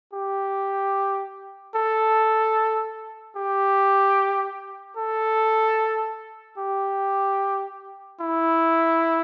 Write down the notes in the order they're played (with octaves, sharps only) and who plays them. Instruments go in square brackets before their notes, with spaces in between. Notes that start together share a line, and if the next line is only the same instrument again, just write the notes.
[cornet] G4
A4
G4
A4
G4
E4